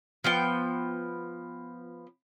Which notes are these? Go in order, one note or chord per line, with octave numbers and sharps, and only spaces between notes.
F3 B3 G5